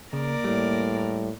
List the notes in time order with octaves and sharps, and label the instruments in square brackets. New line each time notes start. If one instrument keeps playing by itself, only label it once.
[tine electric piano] C#3 [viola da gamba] A#3 A#4 D5
[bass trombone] A2 [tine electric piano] G3